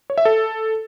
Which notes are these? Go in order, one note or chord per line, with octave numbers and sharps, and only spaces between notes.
C#5
E5
A4